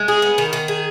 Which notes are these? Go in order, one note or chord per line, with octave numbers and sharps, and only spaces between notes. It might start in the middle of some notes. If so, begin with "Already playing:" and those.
Already playing: G#3
G#4
B3
D#3
D#3
G#4